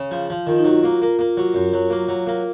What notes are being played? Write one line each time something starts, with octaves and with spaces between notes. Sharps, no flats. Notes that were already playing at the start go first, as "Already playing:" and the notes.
Already playing: C#3
F3
F3
D#3 F4
D#4
F#3 F4
A#3
A#3
A#3
F#3
F#2
F#3
A#3
F#3
A#3